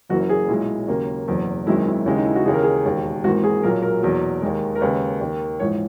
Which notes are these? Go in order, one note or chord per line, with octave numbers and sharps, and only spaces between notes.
F#1 F#2 E3 A#3 F#4
G#4
B1 A#2 G#3 E4
D#2 C#3 F#3 A#3
F#1 E2 B2 F#3
G#1 F#2 D#3 G#3 E4
E4
D#2 C#3 G#3 E4
D#4
E4
F#4
D#2 C#3 E3 G#4
A#4
G#4
E1 D#2 D#3
G#1 G#2 E3 A#3 F#4
G#4
B1 A#2 F#3 A#4
A#4
E2 B2 F#3 A#3
D#2 D#3 G#3
A#4
D#2 C#3 G#3 B4
D#2 D#3 A#3
A#1 G#2 E3 C#5